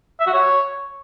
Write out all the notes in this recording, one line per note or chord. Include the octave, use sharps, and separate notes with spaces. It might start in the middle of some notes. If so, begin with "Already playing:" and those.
E5
F#4
C#5